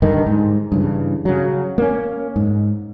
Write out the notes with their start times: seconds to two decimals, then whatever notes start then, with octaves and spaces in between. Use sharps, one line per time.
0.02 G2 D3 D#3
0.27 G#2
0.72 G2 C#3 E3
1.25 C#3 F#3
1.78 A#3 C#4
2.36 G#2